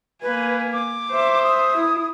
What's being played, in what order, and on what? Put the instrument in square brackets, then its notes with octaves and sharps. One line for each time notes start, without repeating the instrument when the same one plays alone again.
[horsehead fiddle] A#3 G#5 [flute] B4
[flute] D6
[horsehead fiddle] C5 E5
[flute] D#6
[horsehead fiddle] E4